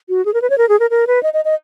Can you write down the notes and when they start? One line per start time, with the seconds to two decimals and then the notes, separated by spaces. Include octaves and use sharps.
0.09 F#4
0.25 G#4
0.34 A#4
0.42 B4
0.50 C#5
0.58 A#4
0.69 G#4
0.80 A#4
0.90 A#4
1.07 B4
1.23 D#5
1.34 D#5
1.45 D#5